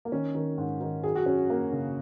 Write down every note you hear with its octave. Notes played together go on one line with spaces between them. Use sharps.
A#3
D#3 C#4
D#3
G#2
D#3
F#2 G#4
F#4
F#2 C#4
F#2 A#3
C#3